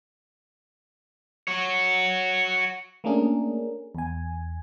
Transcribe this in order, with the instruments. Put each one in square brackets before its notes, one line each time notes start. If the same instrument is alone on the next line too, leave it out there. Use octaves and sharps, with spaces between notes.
[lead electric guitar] F#4 C#5
[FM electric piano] A3 A#3 C#4 D4 G#4 A#4
E2 G#5